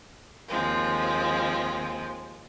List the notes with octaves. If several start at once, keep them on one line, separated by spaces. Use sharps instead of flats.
D#2 F3 G#3 C4